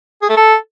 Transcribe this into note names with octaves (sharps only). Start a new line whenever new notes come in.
G#4
A3
A4